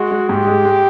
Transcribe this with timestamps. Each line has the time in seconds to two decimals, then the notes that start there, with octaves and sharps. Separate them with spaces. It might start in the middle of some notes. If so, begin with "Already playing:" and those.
Already playing: G#3 F#4
0.11 G#3
0.29 G#2 G4
0.47 G#3
0.65 G#3